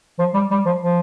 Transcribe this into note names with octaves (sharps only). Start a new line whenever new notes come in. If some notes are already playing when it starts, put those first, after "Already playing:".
F3
G3
G3
F3
F3